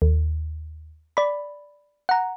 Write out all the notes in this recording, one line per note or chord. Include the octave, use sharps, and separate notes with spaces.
D#2
D5 B5
F#5 A#5